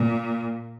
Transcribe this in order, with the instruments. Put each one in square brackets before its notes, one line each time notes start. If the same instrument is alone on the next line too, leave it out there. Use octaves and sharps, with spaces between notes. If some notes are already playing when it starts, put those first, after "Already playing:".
Already playing: [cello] A#2